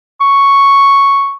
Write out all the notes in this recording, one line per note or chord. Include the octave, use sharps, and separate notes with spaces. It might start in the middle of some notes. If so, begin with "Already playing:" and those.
C#6